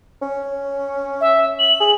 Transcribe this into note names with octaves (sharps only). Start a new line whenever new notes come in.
C#4
E5
F#7
G#4